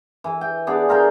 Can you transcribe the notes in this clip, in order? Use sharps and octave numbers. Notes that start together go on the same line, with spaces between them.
E3
G5
B3 D4 G#4 D5
F4 A#4 F5 G5